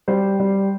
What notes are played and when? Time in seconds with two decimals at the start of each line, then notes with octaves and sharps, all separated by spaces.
0.08 G3 C5
0.40 G3